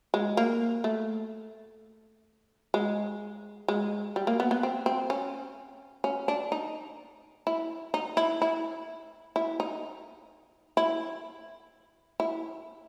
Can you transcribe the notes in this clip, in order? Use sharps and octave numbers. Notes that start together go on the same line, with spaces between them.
G#3
A#3
A3
G#3
G#3
G3
A#3
B3
B3
C4
C4
C#4
C#4
D4
D#4
E4
D#4
E4
E4
E4
D#4
E4
E4